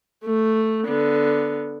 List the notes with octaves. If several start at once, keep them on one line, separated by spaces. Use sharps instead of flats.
A3
D3 B3